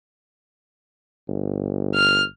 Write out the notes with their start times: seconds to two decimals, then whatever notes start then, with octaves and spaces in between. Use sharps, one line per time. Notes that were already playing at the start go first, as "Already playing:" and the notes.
1.28 G1
1.94 F6